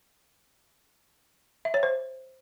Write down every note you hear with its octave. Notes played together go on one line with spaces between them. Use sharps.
E5
C#5
C5